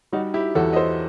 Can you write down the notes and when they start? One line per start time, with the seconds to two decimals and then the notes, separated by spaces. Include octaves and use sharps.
0.13 G3 D#4 F#4
0.34 E4 G4
0.55 E2 F#4 A4
0.73 D#5
0.76 A4 C5